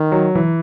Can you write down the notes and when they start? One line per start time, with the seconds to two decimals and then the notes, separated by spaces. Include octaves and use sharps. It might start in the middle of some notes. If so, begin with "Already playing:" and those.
Already playing: D#3
0.12 F#3
0.35 E3